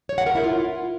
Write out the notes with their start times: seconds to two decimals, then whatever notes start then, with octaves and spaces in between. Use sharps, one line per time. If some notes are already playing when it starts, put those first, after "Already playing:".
0.09 C#5
0.18 F#5
0.27 A#4
0.35 E4
0.44 F4